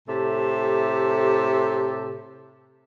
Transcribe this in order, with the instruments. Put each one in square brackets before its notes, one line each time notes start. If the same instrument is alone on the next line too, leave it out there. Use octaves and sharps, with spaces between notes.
[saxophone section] A2 C3 G4 A4